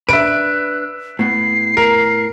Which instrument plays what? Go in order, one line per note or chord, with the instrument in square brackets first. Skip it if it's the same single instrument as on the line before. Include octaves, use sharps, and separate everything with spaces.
[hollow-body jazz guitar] D4 B4 [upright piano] E5 D7 [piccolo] F#6
[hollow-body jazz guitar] A2 B3 [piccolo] C7
[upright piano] A#4